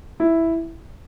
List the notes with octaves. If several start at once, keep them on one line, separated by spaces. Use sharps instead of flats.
E4